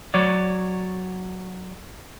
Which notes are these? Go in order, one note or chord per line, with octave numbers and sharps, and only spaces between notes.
F#3 C#5 D5